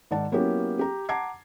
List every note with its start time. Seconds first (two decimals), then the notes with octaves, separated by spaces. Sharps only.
0.11 G#2 D#3 D5 F#5 A5
0.32 F#3 A#3 B3 C#4 E4 G4
0.79 G4 A#5
1.09 F#5 A5 A#5 D6 G#6 C7